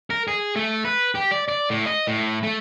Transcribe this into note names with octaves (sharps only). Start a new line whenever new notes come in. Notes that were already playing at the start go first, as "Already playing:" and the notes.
A#4
G#4
A3
B4
G4
D5
D5
A2
D#5
A2
A3